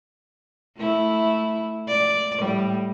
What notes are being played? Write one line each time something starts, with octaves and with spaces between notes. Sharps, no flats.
A3 E4
D5
A2 G3